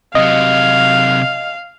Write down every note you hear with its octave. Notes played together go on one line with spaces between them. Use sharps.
C3 F#3 D#5 F5